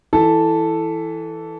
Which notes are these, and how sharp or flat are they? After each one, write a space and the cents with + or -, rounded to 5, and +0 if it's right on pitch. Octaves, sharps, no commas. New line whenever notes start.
E3 -5 A4 +0